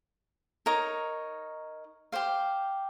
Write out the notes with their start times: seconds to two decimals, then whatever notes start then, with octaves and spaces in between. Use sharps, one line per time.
0.66 D#4 A#4 C#5
2.12 G4 C5 F5